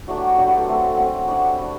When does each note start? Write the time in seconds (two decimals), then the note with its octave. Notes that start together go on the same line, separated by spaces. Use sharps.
0.08 F#3 A3 D4 F#4
0.18 G4
0.27 F#4
0.38 F#3 A3 D4 G4
0.47 B4 D5
0.58 F#4 A4
0.67 F#3 A3 C4
0.97 F#3 A3 C4
1.28 G3 D4 F#4
1.58 G3 D4